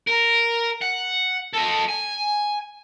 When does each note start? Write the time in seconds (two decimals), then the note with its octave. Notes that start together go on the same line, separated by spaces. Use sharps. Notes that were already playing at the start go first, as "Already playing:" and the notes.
0.07 A#4
0.82 F#5
1.54 A4 D#5
1.89 G#5